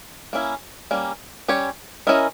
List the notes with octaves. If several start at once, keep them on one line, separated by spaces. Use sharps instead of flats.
A#3 C#4 E4
G3 A#3 C#4
G3 C#4 G4 C#5
C#4 E4 A#4 D#5